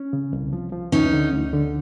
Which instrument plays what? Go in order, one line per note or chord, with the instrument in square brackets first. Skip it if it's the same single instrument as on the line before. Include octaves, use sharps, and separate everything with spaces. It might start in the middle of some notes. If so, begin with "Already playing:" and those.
Already playing: [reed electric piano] C#4
C#3
C2
F3
F3
[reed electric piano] D2 [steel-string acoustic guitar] C#4 D#4
[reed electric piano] D3
D2
D3